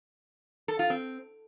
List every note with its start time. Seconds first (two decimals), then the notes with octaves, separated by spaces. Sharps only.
0.68 A4
0.79 F4
0.90 C4